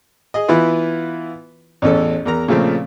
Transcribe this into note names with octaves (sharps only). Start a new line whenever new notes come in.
G#4 D#5
E3 B3 E4 F4 B4
A1 E2 C#4 A4
E2 A#4 A#5
A#2 C#3 F3 A3 C4